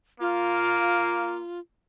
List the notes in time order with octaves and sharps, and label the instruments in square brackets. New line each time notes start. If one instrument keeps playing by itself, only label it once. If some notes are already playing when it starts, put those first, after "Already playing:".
[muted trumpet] A#3 [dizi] F4